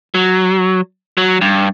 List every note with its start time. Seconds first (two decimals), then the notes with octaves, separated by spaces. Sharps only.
0.15 F#3
1.17 F#3
1.42 G2